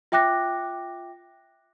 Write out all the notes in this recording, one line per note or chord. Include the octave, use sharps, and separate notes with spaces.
F4 E5 G5 D6 F#6 A#6